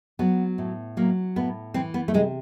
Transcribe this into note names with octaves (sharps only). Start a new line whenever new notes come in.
F#3 B3
A2
F#3 A#3
A2 B3
E3 C4
B3
A3
C3 G#3